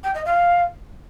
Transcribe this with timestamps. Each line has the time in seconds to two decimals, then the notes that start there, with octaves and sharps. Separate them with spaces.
0.03 G5
0.14 D#5
0.25 F5